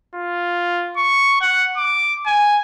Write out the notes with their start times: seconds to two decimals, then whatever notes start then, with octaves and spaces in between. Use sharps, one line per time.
0.15 F4
0.97 C#6
1.41 F#5
1.77 D6
2.26 G#5